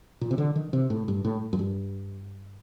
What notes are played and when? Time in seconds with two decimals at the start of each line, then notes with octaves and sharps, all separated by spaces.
0.21 A#2
0.31 C3
0.38 D3
0.56 D#3
0.73 C3
0.90 A2
1.08 G2
1.25 A2
1.53 F#2
1.59 G2